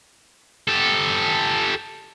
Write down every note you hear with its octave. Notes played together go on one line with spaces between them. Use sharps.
G4 A4